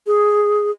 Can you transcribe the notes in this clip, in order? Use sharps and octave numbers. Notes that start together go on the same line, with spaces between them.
G#4